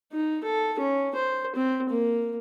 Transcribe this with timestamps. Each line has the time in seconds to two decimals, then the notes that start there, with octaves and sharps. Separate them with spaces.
0.12 D#4
0.44 A4
0.79 C#4
1.15 C5
1.55 C4
1.90 A#3